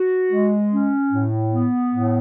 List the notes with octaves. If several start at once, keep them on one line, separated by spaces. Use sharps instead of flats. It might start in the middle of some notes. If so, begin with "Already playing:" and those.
Already playing: F#4
G#3
C#4
A2
B3
A2